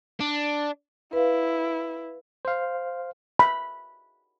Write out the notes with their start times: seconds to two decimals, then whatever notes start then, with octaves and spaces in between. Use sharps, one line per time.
0.20 D4
1.13 E4 B4 F5
2.45 C5 F5
3.39 B5